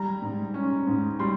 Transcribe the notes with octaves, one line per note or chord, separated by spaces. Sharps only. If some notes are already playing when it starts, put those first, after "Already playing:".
Already playing: G3 A#5
G#2
C#4
G#2
G3 C6